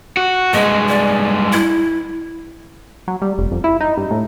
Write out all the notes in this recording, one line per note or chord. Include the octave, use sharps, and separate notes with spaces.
F#4
G2 G#3 D#5
D5
E4
F#3
G3
F1
F2
E4
D#4
G2
A2